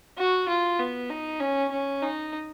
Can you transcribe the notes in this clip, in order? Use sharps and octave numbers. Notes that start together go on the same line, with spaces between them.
F#4
F4
B3
D#4
C#4
C#4
D#4